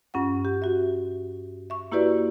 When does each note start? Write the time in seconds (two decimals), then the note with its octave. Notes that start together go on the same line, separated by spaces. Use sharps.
0.14 G2 C#4 F4 F#5
0.45 G4
0.62 F#4 E5
1.70 E5 C#6
1.92 A#3 E4 F#4 G4 B4 D5